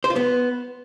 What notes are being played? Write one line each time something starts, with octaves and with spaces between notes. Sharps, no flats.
C5
F4
B3